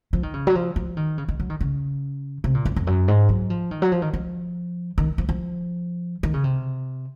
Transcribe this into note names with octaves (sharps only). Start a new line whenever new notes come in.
F3
D#3
C#3
F#3
F3
F3
D#3
C#3
D#3
F#3
D#3
C#3
C3
A#2
F2
F2
F#2
G#2
F#3
F3
D#3
F#3
F3
D#3
F3
D#3
F3
F3
D#3
C#3
C3